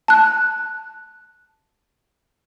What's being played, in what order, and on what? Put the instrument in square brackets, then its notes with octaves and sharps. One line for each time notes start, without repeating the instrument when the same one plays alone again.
[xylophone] A5 F#6